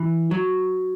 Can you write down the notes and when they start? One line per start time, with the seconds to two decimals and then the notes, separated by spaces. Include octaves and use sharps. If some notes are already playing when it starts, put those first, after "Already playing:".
Already playing: E3
0.31 F#3